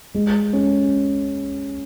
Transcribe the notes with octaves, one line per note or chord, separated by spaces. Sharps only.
G#3
C#4